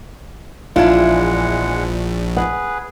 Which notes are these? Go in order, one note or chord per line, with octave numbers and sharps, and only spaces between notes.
A#1 E2 G#3 D4 E4 F4 F#5
G#4 B4 F#5